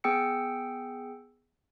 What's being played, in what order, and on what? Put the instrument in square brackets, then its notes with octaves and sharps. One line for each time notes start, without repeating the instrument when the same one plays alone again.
[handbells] B3 G#4 G5 E6 C#7